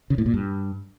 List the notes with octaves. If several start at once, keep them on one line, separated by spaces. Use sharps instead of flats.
C#3
A2
A#2
G2